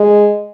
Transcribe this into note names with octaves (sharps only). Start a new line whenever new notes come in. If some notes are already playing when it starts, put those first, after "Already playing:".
Already playing: G#3